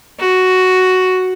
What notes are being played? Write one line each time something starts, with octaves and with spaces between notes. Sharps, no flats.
F#4